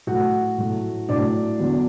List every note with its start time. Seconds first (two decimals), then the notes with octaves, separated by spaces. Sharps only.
0.07 A2 F#3 A3 F#4 F#5
0.58 A2 F#3 A3
1.09 A2 F#3 A3 D4 D5
1.59 E2 D3 F#3